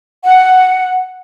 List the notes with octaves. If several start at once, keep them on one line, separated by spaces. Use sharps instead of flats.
F#5